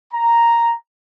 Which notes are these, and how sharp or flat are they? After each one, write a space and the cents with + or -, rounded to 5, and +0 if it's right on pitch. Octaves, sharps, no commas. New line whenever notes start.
A#5 +0